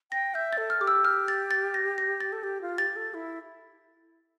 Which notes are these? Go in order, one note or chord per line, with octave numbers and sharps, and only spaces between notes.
G5 A#6
E5 G6
A4 A6
F6
G4 D6
E6
F6
A6
A6
A#6
A#6
A6
A4
G4
F4
G4 A6
A4
E4